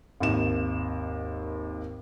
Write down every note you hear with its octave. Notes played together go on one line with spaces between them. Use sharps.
G#1 D#2 E7